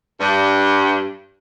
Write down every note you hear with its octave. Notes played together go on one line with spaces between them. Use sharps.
G2